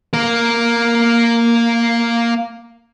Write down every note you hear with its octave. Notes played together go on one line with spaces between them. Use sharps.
A#3 A#4